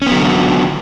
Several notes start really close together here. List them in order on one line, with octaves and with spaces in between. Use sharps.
C#4 B3 F#3 D3